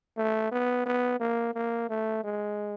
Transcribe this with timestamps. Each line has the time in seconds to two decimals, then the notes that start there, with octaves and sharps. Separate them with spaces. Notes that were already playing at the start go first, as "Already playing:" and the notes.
0.17 A3
0.52 B3
0.86 B3
1.20 A#3
1.54 A#3
1.90 A3
2.24 G#3